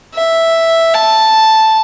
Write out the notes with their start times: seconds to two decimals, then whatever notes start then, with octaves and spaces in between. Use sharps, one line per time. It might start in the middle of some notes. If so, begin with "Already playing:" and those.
0.14 E5
0.94 A5